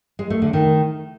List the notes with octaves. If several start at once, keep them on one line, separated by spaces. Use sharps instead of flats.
G#3
A3
D3
D#3